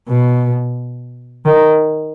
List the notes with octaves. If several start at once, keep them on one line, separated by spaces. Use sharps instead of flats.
B2
D#3